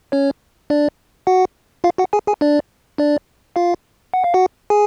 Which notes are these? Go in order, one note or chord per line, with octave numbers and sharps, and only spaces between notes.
C#4 C#5
D4 D5
F#4 F#5
F4 F5
F#4 F#5
G#4 G#5
G#4 G#5
D4 D5
D4 D5
F4 F5
F#5
F5
F#4 F#5
G#4 G#5